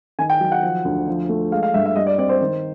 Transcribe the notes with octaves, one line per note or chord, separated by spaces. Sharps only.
D#3 G#5
G5
F#3
F#5
F3
D2
F3
A3
G#3 F5
F5
G2 E5
E5
G3 D#5
D5
C4 D5
C5
D#3